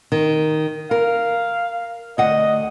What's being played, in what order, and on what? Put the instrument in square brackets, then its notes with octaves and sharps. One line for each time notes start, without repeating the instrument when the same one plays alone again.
[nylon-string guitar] D#3
[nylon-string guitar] A#4 [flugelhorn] F5
[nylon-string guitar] D2 F#5 [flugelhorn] D#5